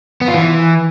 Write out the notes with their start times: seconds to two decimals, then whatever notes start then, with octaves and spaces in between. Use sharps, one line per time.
0.21 B3
0.28 F4
0.34 E3